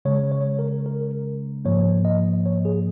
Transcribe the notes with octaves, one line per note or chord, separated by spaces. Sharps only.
C#3 G#3 C#5
C#5
A#4
A#4
G#2 F3 A#3 C#5
D#5
C#5
G#4